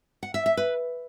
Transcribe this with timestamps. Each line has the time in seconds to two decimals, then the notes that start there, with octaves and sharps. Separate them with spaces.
0.23 F#5
0.34 E5
0.46 E5
0.57 B4